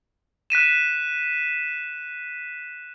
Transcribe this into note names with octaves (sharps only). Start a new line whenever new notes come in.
F#6 B6 D#7 E7